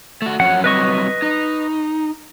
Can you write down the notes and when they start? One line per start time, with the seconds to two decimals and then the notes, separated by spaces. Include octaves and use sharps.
0.22 A3 F#4
0.40 F2 F#3 C#4 F#5
0.64 F#3 G3 C4 B4 D#5 C#6
1.22 D#4